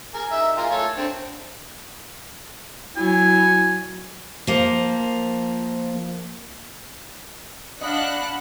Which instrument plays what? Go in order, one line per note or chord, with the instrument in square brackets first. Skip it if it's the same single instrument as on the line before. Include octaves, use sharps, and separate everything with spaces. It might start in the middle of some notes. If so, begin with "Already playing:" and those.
[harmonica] G#4 A#4
D#4 E5
F4 G#4 A#4
A3 A4 C#5
D3 C4
[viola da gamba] F#3 [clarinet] E4 [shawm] G#5
[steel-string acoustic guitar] F3 A#3
[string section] D4 F#6 [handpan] D#5 F5 [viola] F#5 [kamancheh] B5